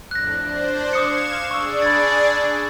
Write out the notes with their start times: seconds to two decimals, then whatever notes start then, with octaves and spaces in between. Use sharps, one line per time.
0.11 F2 A2 D4 F#6 A#6
0.41 D4 C5
0.93 F5 D6 D#6 G#6 C#7 E7
1.51 D4 G#4 D5 C#6 E6
1.82 B5 G#6 A6